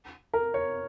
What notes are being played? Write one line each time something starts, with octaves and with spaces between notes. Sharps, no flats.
A#4
C#5